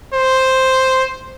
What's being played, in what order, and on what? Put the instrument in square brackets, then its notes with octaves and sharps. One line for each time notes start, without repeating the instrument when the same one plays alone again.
[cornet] C5